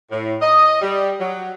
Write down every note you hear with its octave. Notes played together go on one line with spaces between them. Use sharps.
A2
D#5
G3
F#3